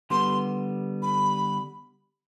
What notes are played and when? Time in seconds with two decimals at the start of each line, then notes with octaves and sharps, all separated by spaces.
0.10 D3 G3 B3 C6
1.02 B5